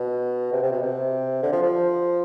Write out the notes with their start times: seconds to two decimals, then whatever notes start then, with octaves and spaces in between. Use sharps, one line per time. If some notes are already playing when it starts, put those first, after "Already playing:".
Already playing: B2
0.52 C3
0.62 C3
0.72 B2
0.82 C3
1.42 D3
1.52 F3
1.62 F3